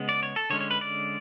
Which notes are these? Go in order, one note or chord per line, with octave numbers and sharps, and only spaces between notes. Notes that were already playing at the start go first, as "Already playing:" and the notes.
Already playing: C#3 G#3 B3
D5
C#5
A4
D3 G#3 C#4 C#5
C#5
B4
D5